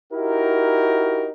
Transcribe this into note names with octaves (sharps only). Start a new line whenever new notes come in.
D#4 E4 F#4 G4 A#4